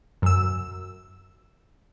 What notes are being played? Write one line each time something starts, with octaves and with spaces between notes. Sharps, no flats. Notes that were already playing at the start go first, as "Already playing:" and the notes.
F#2 E6